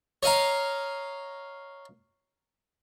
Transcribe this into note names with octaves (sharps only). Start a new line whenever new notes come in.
C#5 D#5 F5 A#5